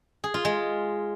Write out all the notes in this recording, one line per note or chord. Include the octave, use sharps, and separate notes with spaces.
G#4
F4
G#3